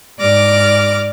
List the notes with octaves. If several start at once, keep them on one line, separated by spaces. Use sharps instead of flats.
G#2 D5 D6 F6 A#6